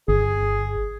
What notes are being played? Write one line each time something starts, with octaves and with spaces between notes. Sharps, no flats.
G1 G#4